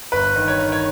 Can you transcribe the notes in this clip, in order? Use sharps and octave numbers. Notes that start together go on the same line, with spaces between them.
G1 B4
D#3
C#5
D#3
C#5